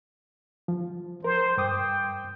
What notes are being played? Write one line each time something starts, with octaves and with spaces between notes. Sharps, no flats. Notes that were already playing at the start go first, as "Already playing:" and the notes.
F3
A#4 C5
G2 G5 D6 D#6